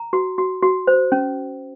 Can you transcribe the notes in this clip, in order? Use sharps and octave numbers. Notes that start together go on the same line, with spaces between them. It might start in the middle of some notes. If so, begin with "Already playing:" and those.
Already playing: A#5
F#4
F#4
F#4
C5
C#4